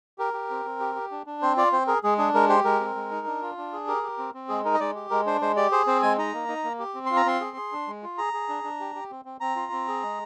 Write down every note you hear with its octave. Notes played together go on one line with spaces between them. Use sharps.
G4 A#4
G4
C4
C4
G4
G4
D4
D4
C4 C5
F4 D5
C4 C5
G#4 A#4
G#3 G#4
D4 G#4
G#3 A#4
G4 C5
G#3 A#4
C4
G#3
D#4
D4
F4
D4
G#4
G4 A#4
G4
C4
C4
G#3 G#4
D#4 A#4
D#5
G#3 D5
G4
G#3 A#4
D4 C5
G#3 C5
G4 D5
G#4 C5
C4 C5
G#3 G#5
D#4 A#5
A#3
D#4
A#3
G4
C4
F4 C6
A#5
C4 C6
G#4
G#4
D4
G#3
F4
G#4 A#5
G#4
D4
D4
G4
G4
C4
C4
C4 A#5
F4
C4
G#4
G#3